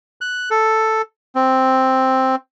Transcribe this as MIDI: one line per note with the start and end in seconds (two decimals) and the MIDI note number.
0.21 0.49 90
0.51 1.02 69
1.35 2.36 60